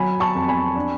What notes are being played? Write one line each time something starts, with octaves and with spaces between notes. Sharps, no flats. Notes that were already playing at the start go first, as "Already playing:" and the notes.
Already playing: F#3 G#5 B5
A5 C#6
F2
G#5 B5
D4